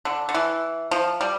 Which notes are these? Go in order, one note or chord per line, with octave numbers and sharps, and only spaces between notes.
D3
D3
E3
F3
G3